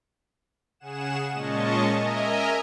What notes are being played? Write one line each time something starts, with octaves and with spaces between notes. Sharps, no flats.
C#3 G#4 F#5 E7
A#2 G#3 C#4 D#5 A5 C#6
A#4 D#5 E5 G#5 A#5